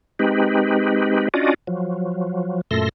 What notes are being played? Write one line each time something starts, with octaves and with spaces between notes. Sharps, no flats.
G#3 C4 D#4 G4 B4
C#4 D4 F4 F#4 D5 D#5
F3 F#3
F#2 A#2 A3 A4 C6 A#6